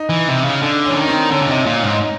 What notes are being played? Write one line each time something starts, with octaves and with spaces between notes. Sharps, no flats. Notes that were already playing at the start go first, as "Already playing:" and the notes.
Already playing: D#4
E3
C3
C#3
D3 D4
C#4
E3
D#3
C4
D3 C#4
C#3
C3 D#4
A#2 D#4
G#2 D#4
D#4